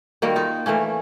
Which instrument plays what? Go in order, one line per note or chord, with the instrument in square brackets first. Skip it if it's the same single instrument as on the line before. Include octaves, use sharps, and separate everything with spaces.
[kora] D#3 G3 A#3 F#4
D#4 F4
E3 A3 A#3 C#4